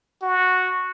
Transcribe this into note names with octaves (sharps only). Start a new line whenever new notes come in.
F#4